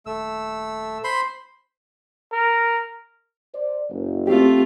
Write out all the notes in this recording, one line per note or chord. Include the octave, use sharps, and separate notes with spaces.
D#1 A3 E6
C5 B5 C6
A#4
C5 D5
F#1
A3 C4 F4 G4